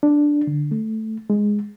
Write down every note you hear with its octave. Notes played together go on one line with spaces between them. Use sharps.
D4
D3
A3
G#3